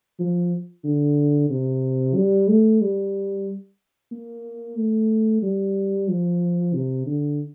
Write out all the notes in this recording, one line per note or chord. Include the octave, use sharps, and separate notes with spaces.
F3
D3
C3
G3
A3
G3
A#3
A3
G3
F3
C3
D3